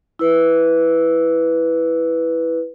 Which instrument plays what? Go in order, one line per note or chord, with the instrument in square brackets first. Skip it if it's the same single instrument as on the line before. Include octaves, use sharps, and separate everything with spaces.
[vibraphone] E4 B4